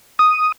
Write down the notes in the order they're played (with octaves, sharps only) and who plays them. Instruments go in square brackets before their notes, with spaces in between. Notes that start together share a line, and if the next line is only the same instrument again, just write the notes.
[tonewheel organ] D#6